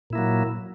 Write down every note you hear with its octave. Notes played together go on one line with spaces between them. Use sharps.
A#2 F#3 A#3 E4